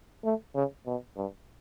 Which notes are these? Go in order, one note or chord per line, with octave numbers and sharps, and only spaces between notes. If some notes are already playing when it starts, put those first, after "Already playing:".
A3
C#3
B2
G2